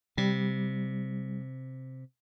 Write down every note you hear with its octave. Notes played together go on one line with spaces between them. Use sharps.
C3 G3